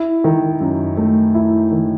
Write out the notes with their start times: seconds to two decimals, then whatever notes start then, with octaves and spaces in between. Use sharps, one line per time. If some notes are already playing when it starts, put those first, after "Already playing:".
Already playing: E4
0.24 D#3
0.60 F#2
0.97 A3
1.35 E4
1.72 D#3